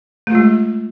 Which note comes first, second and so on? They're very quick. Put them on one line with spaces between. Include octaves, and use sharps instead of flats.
A3 F4 G#3